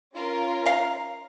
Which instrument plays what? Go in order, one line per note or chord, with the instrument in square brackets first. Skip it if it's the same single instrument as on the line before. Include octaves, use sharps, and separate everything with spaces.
[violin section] C#4 F4 A#4
[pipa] F5 A#5